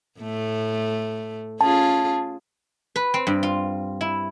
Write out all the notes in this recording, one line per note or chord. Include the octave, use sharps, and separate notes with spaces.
A2 A3
C#4 F4 G#4 A5
B4
C4
G2
F4
E4